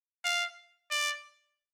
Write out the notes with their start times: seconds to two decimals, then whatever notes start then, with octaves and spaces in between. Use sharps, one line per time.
0.25 F5
0.91 D5